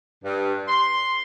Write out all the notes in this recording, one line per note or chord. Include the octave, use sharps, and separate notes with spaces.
G2
C6